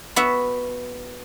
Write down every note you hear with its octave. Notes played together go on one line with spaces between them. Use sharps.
B3 F#4 E5